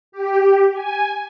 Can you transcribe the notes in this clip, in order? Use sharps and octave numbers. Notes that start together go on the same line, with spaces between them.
G4
G#5